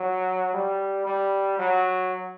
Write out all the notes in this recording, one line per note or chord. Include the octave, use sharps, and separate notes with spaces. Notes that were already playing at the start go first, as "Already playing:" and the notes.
Already playing: F#3
G3
G3
F#3